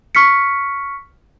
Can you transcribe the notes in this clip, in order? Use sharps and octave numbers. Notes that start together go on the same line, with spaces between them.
C#6 F6 B6 C#7